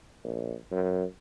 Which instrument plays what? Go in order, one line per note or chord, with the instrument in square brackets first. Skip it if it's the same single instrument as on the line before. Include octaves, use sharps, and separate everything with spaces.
[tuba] A#1
F#2